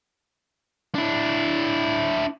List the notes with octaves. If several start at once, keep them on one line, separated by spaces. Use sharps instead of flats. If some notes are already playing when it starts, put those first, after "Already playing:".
D4 E4